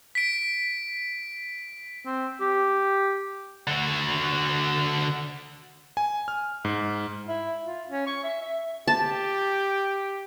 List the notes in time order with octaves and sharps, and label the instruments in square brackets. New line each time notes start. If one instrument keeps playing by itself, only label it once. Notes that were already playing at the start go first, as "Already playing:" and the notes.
[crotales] B6 D7
[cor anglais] C4
G4
[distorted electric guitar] D3 F#4
[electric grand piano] G#5
F6
G#2
[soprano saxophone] E4
F4
C#4
C#6
E5
E5
[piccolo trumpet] G4 [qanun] A5